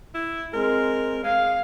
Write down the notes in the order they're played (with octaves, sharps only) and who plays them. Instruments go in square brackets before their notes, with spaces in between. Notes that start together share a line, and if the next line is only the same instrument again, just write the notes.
[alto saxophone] E4
[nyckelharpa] G#3 C4 [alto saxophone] A#4
[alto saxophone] G#3 [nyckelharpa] F5